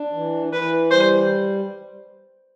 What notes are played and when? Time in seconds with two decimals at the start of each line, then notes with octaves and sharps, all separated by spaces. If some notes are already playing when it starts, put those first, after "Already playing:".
Already playing: D4
0.13 E3
0.53 E3 B4
0.91 G3 C5